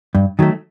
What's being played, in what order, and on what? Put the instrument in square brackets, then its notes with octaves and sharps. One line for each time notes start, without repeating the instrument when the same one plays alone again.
[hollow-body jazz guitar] G2
D#3 F#3 A3